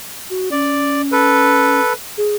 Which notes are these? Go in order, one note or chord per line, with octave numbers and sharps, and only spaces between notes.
F#4
C#4 D5
A4 B4
G#4